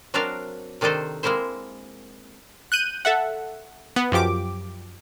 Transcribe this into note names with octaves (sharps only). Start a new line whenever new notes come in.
F#3 C4 D4 A#4 D5 F5
C3 D#3 D4 D#4 A4 C5
G#3 A#3 C4 E4 C5
F#6 G6 D#7
A4 E5 F#5
B3
F#2 F3 G4 D6